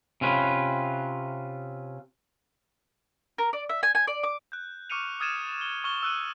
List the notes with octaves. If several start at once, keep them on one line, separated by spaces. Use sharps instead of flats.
C3 C#4 F4 B4
A#4
D5
E5
G#5
G#5
D5
D6
F#6 G6
C#6 D6 F6 C#7 D#7 F7
D#6 F6 G#6 A6 D#7 E7
G7
C#6 F6 G7
E6 F#6 D#7